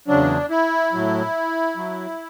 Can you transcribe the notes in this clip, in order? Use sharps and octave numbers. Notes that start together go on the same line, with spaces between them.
E2 C#3 F#3 D4
E4
A2 F#3
F#3